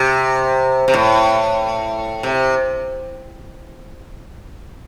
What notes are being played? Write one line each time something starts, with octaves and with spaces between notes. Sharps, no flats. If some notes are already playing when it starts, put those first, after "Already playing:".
Already playing: C3
C3
A2
C3